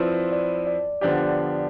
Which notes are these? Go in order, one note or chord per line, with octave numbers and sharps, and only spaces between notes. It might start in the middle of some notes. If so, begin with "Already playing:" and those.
Already playing: F3 C4 E4 B4 D5
D5
D5
D3 F3 B3 D4 G4 D5